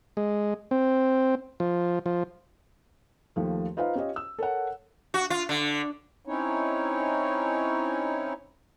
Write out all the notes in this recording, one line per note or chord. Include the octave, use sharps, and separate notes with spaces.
G#3
C4
F3
F3
D#2 F3 A3
D#4 F4 B4 C5 F5
C#4 F4 G4 C#5 D#5
E6
A4 A#4 C#5 F#5
F#4
F4
D3
C4 C#4 D#4 E4 C#5